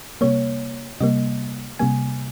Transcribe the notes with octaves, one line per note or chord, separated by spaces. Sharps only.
C3 G3 A#3 C#5
C3 G3 A#3 D#5
C3 G3 A#3 G#5